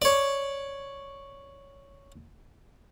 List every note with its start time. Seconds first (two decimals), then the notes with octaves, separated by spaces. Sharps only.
0.02 C#5 D5